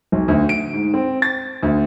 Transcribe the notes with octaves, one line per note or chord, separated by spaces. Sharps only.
B1
D2
D7
G#2
C4
A6
D2